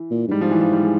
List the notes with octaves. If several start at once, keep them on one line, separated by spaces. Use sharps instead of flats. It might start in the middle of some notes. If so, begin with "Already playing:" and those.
Already playing: E3
A#2
G2
G#2 G3
F3
E3
F3
G3
G#3